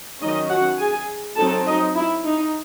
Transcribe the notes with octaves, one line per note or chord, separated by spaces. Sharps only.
D#3 F#3 C#4 D#4 D#5
F#4 F#5
G#4 G#5
F#3 C4 D#4 A4 A5
D#4 D#5
E4
D#4